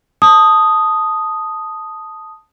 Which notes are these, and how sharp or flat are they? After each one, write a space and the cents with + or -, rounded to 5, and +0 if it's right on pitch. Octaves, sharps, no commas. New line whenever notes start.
A5 +0 D#6 +0